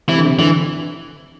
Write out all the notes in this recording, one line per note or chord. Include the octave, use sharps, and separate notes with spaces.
C3 E3
D3
C3
D3 E3